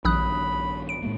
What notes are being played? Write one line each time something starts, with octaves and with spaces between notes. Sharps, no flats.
A#1 G2 D#3 B5 D#6 F#6
D7
A2 G#3 A#3